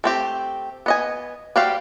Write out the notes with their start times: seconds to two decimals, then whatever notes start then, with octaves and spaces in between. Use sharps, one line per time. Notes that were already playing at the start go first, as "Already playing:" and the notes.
0.04 A3 C4 G4
0.86 B3 D#5 G#5
1.56 G3 F#4 G4 C5 F5